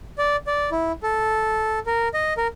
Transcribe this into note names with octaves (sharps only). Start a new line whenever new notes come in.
D5
D5
E4
A4
A#4
D#5
A#4